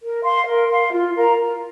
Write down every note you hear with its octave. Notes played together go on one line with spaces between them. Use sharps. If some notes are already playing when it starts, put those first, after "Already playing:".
A#4
F5 C6
A#4
F5 C6
F4
A#4 F5 A#5
F4